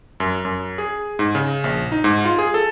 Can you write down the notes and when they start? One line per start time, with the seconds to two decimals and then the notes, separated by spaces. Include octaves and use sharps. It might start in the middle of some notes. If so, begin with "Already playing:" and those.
0.20 F#2
0.45 F#2
0.78 G#4
1.19 G#2
1.35 C#3
1.64 A#1
1.92 D#4
2.04 G#2
2.25 F4
2.39 G#4
2.54 A4